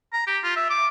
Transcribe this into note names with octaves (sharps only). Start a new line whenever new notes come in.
A#5
G4
F4
E5
D6